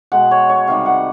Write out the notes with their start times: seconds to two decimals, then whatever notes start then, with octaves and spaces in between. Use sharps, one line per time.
0.12 B2 G#3 F#5
0.31 C#5
0.49 C#5
0.67 C3 D#3 G3 F5
0.86 F#5